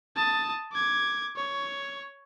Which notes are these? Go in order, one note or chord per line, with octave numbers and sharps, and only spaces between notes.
A5 D#6
D6 G#6
C#5